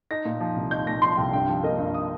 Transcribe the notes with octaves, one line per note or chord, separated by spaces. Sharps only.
D#4 A#6
A#2
F3
C2
D#4 G6
A#2 A#6
F3 C6
C2 G5
G2 G5
F3
A#3 D#5
G2
D#6